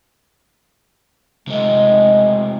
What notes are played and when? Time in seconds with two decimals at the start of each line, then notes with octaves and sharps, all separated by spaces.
1.48 C3 G#3 A3